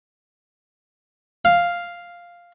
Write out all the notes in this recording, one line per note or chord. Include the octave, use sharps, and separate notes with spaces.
F5